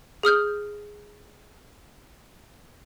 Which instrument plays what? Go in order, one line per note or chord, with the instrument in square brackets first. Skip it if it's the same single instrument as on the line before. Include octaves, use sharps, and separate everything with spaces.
[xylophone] G#4 D#6 F6 G6